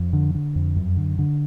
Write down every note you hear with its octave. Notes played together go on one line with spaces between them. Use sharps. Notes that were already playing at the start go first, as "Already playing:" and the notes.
Already playing: F2
D3
D3
F2
F#2
D3
D3